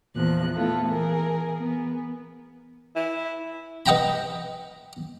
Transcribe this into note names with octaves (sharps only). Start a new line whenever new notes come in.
E2 A#2 F3 F#6
A3 B3 E4 F4 A4
E3 G#4 A#4
B3
E4
B4 D#5 F#5 G5 A#5 B5